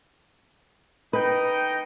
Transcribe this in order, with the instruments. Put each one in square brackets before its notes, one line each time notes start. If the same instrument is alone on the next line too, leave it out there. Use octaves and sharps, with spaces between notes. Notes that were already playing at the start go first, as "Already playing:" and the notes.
[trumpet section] D#4 D#5 G5 [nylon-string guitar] B4